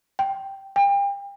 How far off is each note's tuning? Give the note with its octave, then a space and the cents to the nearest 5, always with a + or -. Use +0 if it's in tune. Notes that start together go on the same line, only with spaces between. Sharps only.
G5 -10
G5 +35